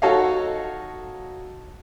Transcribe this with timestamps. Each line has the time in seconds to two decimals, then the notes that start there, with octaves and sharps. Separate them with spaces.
0.02 D#4 F#4 A4 C#5 D#5 F5